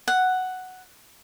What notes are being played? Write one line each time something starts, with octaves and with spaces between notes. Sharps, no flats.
F#5